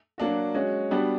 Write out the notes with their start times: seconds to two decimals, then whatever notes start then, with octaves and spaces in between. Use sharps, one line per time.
0.18 F#3 A#3 D4 F#4
0.54 G#3 C#4 F#4
0.91 G3 B3 D4 F#4